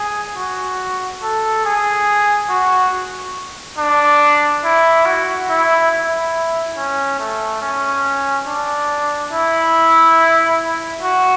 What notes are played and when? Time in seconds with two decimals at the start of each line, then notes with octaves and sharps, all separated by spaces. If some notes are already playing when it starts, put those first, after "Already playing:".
Already playing: G#4
0.37 F#4
1.23 A4
1.65 G#4
2.50 F#4
3.78 D4
4.64 E4
5.06 F#4
5.49 E4
5.91 E4
6.77 C#4
7.19 A3
7.62 C#4
8.47 D4
9.32 E4
11.02 F#4